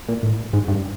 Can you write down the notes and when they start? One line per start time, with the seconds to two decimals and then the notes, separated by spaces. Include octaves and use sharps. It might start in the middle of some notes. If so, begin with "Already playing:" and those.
0.09 A#2
0.23 A2
0.53 G#2
0.68 G2